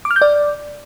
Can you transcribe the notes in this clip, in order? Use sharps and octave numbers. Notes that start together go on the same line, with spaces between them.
D6
F6
G6
D5